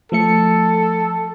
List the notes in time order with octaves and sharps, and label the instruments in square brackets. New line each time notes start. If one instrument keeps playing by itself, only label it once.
[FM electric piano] F3 A3 C#7 [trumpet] A4